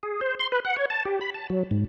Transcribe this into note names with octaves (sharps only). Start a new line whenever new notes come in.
G#4
C5
C6
B4
F#5
C#5
A5
G4
B5
A5
F#3
G#2